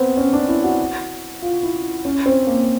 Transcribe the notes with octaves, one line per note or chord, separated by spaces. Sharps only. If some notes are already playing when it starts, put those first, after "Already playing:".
Already playing: B3 C4
C#4
D4
E4
F#4
F4
E4
C#4
C4
A#3